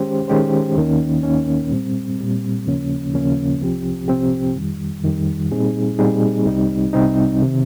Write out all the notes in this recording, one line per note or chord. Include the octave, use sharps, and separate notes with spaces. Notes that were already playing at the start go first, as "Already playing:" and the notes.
Already playing: D#3 G#3 C#4 G4 C5
D#3 G#3 C#4 G4 C5
D#2 D#3 A#3 C#4
D#2 D#3 A#3 C#4
A#2 G3 C4
A#2 G3 C4
D#2 C#3 F3 A#3 C#4
D#2 C#3 F3 A#3 C#4
C2 C3 F3 C4 G4
C2 C3 F3 C4 G4
F2 D#3 G3
F2 D#3 G3
A#2 G3 C4 D#4 G#4
A#2 G3 C4 D#4 G#4
C2 C3 G3 C4 D#4
C2 C3 G3 C4 D#4
C3 D#3